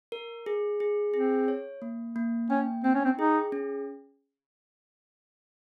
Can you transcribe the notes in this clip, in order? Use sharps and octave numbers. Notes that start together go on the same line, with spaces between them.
A#4
G#4
G#4
C4 G#4
C#5
A#3
A#3
C#4 G5
C4 G5
C#4
C4
D#4 G#4
C#4